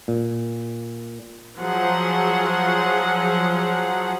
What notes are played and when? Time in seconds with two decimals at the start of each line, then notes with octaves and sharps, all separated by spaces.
0.08 A#2
1.59 F3 F#3 G#4 F#5